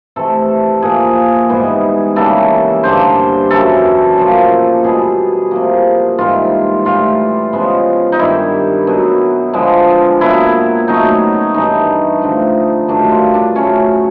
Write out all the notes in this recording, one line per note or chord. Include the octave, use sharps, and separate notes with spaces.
C3 E3 A3 A4
A#2 F3 A#3 G#4
G#2 E3 G3 B3
C#3 E3 G3 A#3 A4
G2 D3 G3 A#3 C5
F#2 C#3 E3 A4
A#2 F3 A#3
B2 G3 B3 G#4
C3 F3 A#3
G#2 E3 G3 F4
A2 E3 G3 F4
C#3 F3 G#3 B3
D#4
G2 D#3 G3 E4
B2 F#3 B3
D3 F3 G#3 B3
A#2 F#3 B3 E4
C#3 F#3 A3 D#4
G2 E3 G3 D#4
D3 F3 A3
G2 D#3 F#3 A3 D4
F4
D4
C#3 F#3 A3 C#4